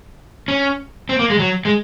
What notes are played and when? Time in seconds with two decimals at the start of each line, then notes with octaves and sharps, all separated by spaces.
0.48 C#4
1.09 C4
1.19 A#3
1.30 G#3
1.39 F#3
1.65 G#3